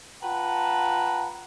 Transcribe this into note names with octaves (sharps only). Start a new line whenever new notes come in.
F4 B4 F#5 G5 A5 A#5